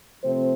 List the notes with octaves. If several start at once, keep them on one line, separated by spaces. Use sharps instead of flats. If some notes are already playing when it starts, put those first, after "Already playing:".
C3 F3 A3 C4 C5